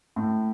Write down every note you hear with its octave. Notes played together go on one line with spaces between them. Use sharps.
A2